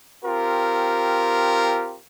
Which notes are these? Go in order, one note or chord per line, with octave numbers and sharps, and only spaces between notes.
C4 F4 G4 A#4